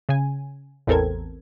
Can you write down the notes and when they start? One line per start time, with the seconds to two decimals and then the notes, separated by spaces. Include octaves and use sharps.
0.09 C#3 G#5
0.87 A1 E2 C4 A4 A#4 G#6